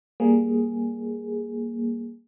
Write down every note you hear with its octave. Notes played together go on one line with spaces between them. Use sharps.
G3 A#3 G#4